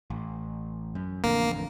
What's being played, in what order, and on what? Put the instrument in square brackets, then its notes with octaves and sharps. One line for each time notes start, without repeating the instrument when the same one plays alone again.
[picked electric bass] A1
F#2
[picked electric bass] A1 F2 D3 [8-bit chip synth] A#3